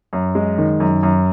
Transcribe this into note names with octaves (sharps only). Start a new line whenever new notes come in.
F#2
G#3
D#3
F#2
F#2